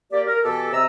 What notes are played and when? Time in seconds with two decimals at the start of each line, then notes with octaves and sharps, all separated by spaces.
0.12 A#3 G4 D5
0.27 A#4
0.44 B2 E3 G4 A4
0.73 C3 D#5 A#5 E6